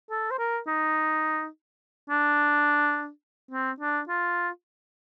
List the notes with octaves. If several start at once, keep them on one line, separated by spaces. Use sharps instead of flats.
A4
C5
A#4
D#4
D4
C4
D4
F4